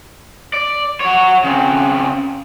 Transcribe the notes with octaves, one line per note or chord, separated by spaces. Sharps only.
D5
F#4 C#5
C#3 C4